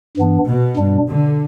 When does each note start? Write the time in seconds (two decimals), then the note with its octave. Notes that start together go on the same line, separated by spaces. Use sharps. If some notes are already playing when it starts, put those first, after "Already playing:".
0.17 G2 E3 B3 D4
0.47 B2
0.77 G2 G3 D4
1.07 D3